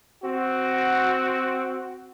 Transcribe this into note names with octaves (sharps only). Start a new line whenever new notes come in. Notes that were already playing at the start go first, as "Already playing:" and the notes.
C4 F#4